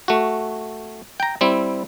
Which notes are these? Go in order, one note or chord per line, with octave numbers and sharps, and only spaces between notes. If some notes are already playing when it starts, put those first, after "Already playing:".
A3 F#4
G5 A#5
G3 C4 E4